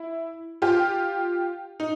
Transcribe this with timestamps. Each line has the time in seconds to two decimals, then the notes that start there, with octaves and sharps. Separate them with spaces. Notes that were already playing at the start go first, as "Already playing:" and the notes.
Already playing: E4
0.62 F4 G4
1.80 D#4